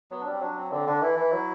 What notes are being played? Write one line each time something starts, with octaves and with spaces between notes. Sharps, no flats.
F#3 B3
D4
G3
C4
F#3 D4
C4
D3 C4
D3 D4
E3 E4
E3
F#3